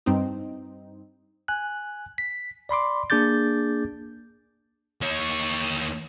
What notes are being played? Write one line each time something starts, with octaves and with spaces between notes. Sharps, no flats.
G2 C4 D#4
G#5 F#6
B6
D5 B5 C6 D6
A#3 D4 G#4 D6 G6 A6
D#2 C#5